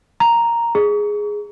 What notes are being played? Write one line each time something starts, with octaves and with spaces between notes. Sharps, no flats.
A#5
G#4